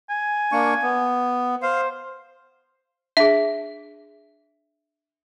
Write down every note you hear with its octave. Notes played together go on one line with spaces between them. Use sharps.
G#5
A#3 D4 C#6
B3
C5 F5
D4 G#4 E5